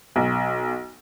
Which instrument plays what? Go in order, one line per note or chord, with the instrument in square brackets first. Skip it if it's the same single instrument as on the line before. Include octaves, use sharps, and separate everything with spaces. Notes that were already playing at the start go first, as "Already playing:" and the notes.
[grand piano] B1